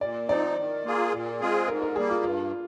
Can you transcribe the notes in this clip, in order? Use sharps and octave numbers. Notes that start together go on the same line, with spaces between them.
A#2 D5
F3 C4 D#4 D5
D#3
A#3 F4 G#4
A#2
G#3 C4 F4 G#4
G#2 A#4
A#4
G3 A#3 G#4
F4
G2 F4